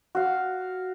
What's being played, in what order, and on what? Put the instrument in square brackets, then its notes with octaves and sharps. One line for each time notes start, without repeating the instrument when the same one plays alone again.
[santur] F#4 F5